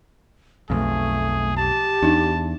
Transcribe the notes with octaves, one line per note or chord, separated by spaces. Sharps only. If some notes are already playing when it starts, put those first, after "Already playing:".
B1 F2 A3 G#4
G4 A5
E2 D4 D#4